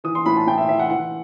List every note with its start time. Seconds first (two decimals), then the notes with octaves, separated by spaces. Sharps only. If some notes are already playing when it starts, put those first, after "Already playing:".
0.04 E3 D#6
0.15 C6
0.26 A2 B5
0.37 A5
0.47 A2 G5
0.58 E5
0.68 E3 E5
0.79 F#5
0.90 E3 F#5